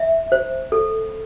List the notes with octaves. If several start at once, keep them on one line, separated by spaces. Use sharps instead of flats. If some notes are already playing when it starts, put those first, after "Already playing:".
Already playing: E5
C5
A4